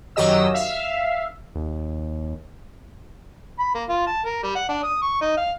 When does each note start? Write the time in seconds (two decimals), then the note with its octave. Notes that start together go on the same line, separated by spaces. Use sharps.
0.16 F#2 D#3 F#3 G4 D#5 E6
0.54 E5 F5
1.55 D#2
3.59 B5
3.75 A#3
3.89 F4
4.07 A5
4.26 A#4
4.43 G3
4.55 F#5
4.69 D4
4.83 D#6
5.02 C#6
5.21 D#4
5.37 F5